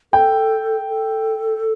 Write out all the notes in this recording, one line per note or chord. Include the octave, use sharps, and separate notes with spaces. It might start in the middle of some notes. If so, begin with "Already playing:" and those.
A4 G5
A4